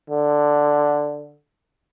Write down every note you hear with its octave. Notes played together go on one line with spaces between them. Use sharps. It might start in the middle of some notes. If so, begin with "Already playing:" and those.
D3